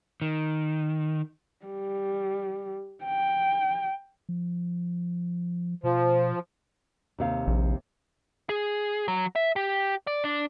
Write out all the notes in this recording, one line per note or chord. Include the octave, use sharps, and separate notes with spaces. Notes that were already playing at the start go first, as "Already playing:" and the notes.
D#3
G3
G5
F3
B2 F3
D#2 C3 F5
A#1
G#4
F#3
E5
G4
D5
D4